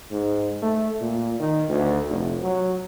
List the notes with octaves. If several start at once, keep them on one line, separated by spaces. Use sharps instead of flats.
G#2
A3
A#2
D#3
D2
F1
F#3